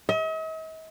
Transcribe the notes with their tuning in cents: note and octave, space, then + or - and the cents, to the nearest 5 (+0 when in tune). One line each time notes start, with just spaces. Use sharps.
D#5 +45